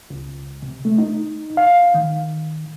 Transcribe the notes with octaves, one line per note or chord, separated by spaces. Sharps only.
C#2
C3
A3
D#4
F5
D#3